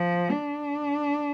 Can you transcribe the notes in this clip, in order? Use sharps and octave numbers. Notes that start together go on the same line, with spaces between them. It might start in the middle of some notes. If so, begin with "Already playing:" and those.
Already playing: F3
D4